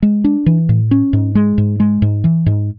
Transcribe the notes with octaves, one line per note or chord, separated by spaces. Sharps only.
G#3
D4
E3
A2
C#4
G#2
G#3
G#2
G#3
G#2
E3
G#2